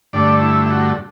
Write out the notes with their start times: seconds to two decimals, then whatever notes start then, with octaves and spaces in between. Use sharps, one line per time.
0.13 G2 D3 A3 D5
0.41 E4
0.66 E4
0.71 F#4